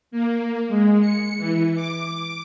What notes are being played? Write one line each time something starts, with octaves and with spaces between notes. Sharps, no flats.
A#3
G#3
C#7
E3
D6